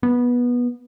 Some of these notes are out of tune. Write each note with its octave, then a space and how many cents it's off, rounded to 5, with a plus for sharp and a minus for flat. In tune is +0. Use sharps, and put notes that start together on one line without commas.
B3 -15